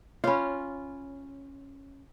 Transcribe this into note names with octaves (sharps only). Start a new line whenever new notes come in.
C#4 F4 C#5 B5